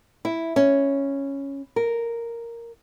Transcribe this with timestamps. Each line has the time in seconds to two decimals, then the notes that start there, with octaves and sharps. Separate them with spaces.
0.25 E4
0.56 C#4
1.76 A#4